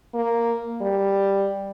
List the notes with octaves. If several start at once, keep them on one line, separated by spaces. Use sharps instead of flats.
A#3
G3